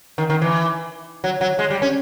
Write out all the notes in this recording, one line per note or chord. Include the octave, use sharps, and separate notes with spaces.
D#3
D#3
E3
F#3
F#3
G#3
G3
C#4